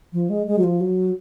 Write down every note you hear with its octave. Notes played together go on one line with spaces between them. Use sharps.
F3
G#3
G#3
F#3
F3
F#3